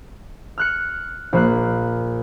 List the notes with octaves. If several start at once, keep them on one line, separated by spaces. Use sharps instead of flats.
F6 F#6 C#7
A#1 A#3 F#6